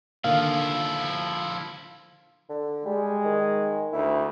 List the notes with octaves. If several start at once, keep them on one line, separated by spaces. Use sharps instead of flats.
D3 D#3 F3 A#3 E4 F5
D3
G3 G#3
D#3
D2 E4